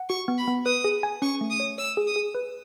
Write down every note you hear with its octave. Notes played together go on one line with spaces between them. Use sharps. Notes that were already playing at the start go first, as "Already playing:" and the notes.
Already playing: F#5
F#4 C#6
B3
B5
B3
B4 D#6
G#4
G#5
C#4 C#6
A3
D#6
C#5
C#5 E6
G#4
D#6
G#4
B4